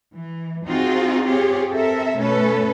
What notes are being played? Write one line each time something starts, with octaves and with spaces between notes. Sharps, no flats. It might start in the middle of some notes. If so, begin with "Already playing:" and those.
E3
C4 D#4 F4 F#4 G#4
C4 F4 G4 G#4 C#5
C4 A4 A#4 E5
B2 A3 C#4 A4 B4